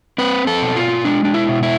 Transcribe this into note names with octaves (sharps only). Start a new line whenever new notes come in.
C4 B4
A4
B2
F4
G#3 D4
D4
E4
B2
E4